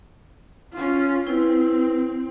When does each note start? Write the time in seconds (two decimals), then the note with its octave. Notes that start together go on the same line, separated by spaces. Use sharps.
0.73 C#4 F4
1.27 C4 E4 B4